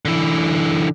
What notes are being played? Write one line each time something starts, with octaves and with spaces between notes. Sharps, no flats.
D3 E3